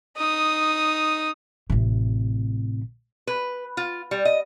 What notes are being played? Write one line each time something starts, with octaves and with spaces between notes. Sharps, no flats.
D#4 D#6
A1 C3
B4
F4
G3
D#5